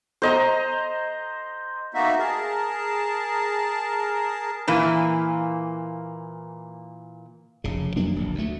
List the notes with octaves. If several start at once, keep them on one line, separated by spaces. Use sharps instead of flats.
C5 D#5 A#5
A#3 B3 D#4 F#4 E5
G#4 A#4 A5
A#2 E3 A#3
F1 C#3
F2 F#3 A#3 D4
D1 A#1
D2 A3